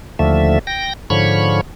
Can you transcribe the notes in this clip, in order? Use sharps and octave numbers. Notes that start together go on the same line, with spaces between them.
D#2 D3 F3 A3 E5
G5 A#6
G#2 D3 F3 C#5 B5 C#6